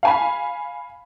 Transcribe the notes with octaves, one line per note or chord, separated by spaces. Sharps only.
F5 G#5 B5